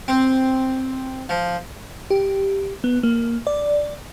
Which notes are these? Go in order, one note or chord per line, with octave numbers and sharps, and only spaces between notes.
C4
F3
G4
B3
A#3
D5